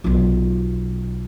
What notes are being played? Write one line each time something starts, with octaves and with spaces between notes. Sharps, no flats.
B1 F4